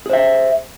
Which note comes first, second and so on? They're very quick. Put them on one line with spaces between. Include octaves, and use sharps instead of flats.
G#4 C5 E5